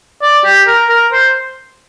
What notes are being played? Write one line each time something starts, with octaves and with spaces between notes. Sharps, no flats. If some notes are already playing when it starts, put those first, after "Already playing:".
D5
G4
A#4
A#4
C5